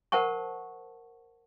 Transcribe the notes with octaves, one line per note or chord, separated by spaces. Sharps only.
A#4 C5 F#5 A5 C#6